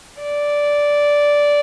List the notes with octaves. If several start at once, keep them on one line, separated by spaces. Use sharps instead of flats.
D5